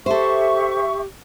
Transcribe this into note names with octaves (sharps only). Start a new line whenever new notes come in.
G4 A4 C5 E5 C#6